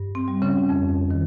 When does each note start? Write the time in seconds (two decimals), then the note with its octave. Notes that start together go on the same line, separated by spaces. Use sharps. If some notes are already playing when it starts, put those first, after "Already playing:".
Already playing: G2
0.15 C4
0.28 G3
0.42 C#3 C#4
0.69 F2
1.11 D#3